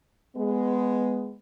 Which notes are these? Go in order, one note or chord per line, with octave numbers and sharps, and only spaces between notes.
G#3 B3